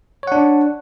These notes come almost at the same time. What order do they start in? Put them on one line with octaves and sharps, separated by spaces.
C#5 F#5 D4